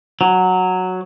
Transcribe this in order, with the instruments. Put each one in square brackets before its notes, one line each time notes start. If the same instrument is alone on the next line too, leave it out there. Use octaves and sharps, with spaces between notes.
[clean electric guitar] F#3